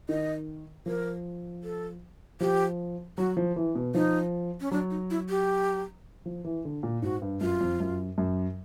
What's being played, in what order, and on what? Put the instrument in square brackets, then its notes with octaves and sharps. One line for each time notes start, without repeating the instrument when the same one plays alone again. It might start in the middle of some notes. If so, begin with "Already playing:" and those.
[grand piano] D#3 [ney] D#5
[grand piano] F3 [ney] A#4
[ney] A4
[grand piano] F3 [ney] G4
[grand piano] F#3 [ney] F#4
[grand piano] F3
E3
B2
[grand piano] F3 [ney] D#4
[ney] C#4
[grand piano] F#3 [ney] D4
[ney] D#4
E4
G4
[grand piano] F3
E3
D3
A#2
[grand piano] G#2 [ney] F#4
[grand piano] G2
[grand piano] F#2 [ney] F4
[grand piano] F2
F#2
F#2